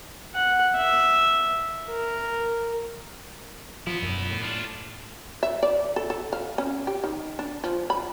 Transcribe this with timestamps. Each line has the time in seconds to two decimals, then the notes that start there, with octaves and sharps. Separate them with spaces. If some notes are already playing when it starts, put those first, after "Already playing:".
0.34 F#5
0.77 E5
1.90 A#4
3.87 F3 B3 E4
4.02 E1 F#2
4.31 A2
4.42 D4 F4
5.43 E5
5.63 D5
5.96 A4
6.10 A4
6.33 F5
6.58 C#4
6.87 G4
7.04 D#3
7.39 D4
7.64 F3
7.90 B5